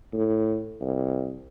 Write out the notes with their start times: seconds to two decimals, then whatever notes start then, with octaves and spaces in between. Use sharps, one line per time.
0.13 A2
0.81 C2